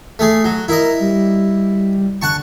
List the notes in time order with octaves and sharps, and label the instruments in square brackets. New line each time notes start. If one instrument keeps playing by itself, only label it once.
[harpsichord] A3 G#4
F#3
[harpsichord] E4 D#5 [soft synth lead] A#4
[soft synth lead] G3
[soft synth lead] D3 [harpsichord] F#5 A5 C#6